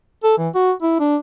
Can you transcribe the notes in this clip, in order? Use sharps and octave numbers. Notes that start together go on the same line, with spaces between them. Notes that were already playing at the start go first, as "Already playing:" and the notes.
A4
E3
F#4
E4
D4